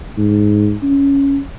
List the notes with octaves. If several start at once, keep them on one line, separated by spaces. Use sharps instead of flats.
G#2
C#4